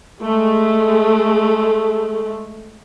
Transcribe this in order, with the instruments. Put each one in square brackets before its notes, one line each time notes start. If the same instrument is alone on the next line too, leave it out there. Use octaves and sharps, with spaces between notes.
[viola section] G#3 A3